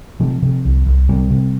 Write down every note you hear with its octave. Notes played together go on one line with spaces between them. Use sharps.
C3 F3
C3
C2
C2
C3 G3
C3